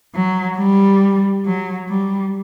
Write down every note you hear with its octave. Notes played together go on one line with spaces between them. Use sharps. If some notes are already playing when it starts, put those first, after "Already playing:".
F#3
G3
F#3
G3